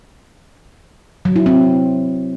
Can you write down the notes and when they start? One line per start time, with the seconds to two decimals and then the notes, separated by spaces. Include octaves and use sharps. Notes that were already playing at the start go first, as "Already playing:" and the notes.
1.25 F#3
1.36 E4
1.46 C4